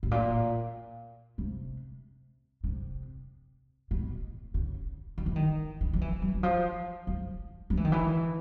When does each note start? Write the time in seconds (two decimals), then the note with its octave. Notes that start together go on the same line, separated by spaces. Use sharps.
0.03 A2
0.11 A#2
1.38 C3
2.64 C3
3.91 B2
4.54 C#3
5.18 D#3
5.26 E3
5.36 D#3
5.81 E3
5.93 F3
6.01 E3
6.22 F#3
6.34 E3
6.43 F3
7.07 F3
7.70 F3
7.77 E3
7.85 D#3
7.92 E3